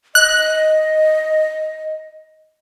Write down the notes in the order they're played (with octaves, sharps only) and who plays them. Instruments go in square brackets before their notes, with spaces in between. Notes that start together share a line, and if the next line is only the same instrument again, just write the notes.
[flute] D#5 [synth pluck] F#6